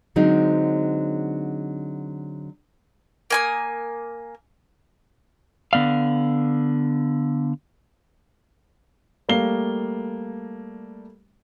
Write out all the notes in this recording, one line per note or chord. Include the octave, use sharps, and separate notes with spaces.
D3 F#3 G#3 C4 D#4
A#3 G#5 D#6
D3 B3 D5 F5
G3 A3 A#3 C7 G7